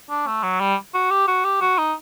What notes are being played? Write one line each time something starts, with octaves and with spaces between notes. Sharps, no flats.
D4
A3
F#3
G3
F#4
G4
F#4
G4
F#4
D#4